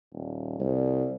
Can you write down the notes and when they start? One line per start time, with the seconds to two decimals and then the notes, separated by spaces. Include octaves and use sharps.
0.13 D#1
0.60 C2